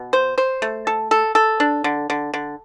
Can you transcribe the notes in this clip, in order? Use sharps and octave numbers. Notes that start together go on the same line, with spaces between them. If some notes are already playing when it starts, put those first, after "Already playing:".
Already playing: B2
C5
C5
A3
A4
A4
A4
D4
D3
D3
D3